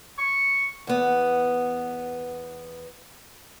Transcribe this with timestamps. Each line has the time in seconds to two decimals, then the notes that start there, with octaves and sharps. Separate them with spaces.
0.18 C#6
0.87 E2 B3